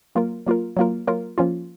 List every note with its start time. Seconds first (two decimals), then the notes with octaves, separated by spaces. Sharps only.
0.15 F#3 A#3 F4 A#4
0.46 F#3 A#3 F4 A#4
0.77 F#3 A#3 F4 A#4
1.07 F#3 A#3 F4 A#4
1.38 F3 A#3 C#4 F4